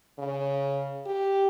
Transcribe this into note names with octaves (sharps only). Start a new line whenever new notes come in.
C#3
G4